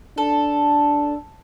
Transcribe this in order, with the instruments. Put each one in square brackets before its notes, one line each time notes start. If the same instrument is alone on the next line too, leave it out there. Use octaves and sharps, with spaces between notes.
[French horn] D4 [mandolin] A4